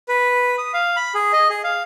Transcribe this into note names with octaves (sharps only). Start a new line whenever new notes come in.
B4
D#6
F5
B5
G#4
D#5
G#4
F5